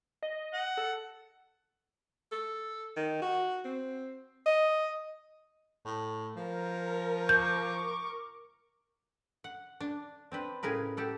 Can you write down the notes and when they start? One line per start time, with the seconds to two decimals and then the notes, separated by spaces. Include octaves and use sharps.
0.22 D#5
0.54 F#5
0.77 A4
2.32 A4
2.96 D#3
3.22 F#4
3.65 C4
4.46 D#5
5.85 A2
6.36 F3 A#4
7.29 C#6 D6 G6
9.44 F#5
9.80 D4
10.32 C4 D4 B4
10.63 A2 C#3 G#4 A#4 B4
10.97 G4 A4 F#5